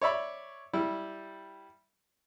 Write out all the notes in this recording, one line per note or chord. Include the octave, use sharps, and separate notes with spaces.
C#5 D5 E5 B5
G3 E4